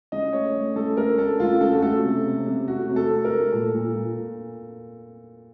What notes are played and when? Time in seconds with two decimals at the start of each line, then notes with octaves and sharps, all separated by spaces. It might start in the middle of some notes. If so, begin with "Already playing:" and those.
0.12 C#3 D#5
0.33 A3 C#5
0.55 A3
0.76 C#3 A4
0.97 A3 A#4
1.18 A3 A4
1.40 C#3 F4
1.61 C#3 A4
1.73 F#4
1.82 A3 A4
2.03 C3
2.25 C3
2.46 C3
2.68 A3 F#4
2.89 C3
2.96 A4
3.10 A3
3.24 A#4
3.31 A3
3.52 A#2 A4
3.74 A#2
3.95 A#2